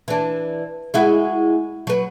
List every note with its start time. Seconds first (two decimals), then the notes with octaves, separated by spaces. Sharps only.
0.08 E3 D4
0.94 G#3 E4 F#4
1.87 F#3 B4